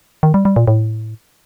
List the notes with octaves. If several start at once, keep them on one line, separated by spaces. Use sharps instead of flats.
D#3
G3
G3
A#2
A2